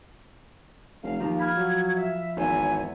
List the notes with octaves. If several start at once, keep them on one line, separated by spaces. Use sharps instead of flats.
F1 F5
D#2 F3 A#5
B5 F6 G#6
F#3
E5
G#1 E2 G#5